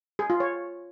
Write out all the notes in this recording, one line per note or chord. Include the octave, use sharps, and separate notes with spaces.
G#4
F4
C#5